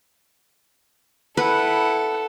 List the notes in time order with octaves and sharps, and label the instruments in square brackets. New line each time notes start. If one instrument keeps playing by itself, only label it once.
[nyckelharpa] E4 F#5 [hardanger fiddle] A4 [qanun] B4